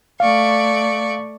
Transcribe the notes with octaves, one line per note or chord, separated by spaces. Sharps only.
A3 D5 F5 C#6